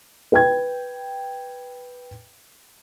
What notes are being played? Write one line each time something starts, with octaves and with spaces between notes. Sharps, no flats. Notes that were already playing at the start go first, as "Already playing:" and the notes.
B4 G5 G#6